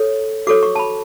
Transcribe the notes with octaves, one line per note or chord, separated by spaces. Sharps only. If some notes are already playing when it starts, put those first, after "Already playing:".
Already playing: A4 C#5
F#4 A4 C#5 D6
C#6
A5
B5